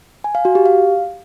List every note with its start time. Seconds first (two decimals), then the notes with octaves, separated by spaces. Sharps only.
0.24 G#5
0.35 F5
0.45 F#4
0.55 G4
0.66 F5